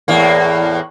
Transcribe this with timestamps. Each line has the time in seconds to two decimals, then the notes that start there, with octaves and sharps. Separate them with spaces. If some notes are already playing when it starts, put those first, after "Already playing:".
0.08 E2 A2 A#3